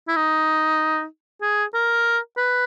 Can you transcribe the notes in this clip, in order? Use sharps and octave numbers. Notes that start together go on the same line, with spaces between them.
E4
D#4
G#4
A#4
B4